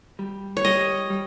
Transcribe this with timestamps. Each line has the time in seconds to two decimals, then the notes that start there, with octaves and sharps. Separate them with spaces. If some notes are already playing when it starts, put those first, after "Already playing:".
0.19 G3
0.57 C#5
0.65 G3 D#5
1.10 G3